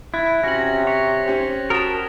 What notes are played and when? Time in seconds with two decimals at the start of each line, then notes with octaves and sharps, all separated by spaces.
0.14 E4 F#6 G#6 A6
0.43 C3 C#4 F#4 A#6 F#7
0.87 C#5 A#6 B6
1.26 C#4 G4 C5
1.70 F#4 A#4 A5 D#6 F6 A6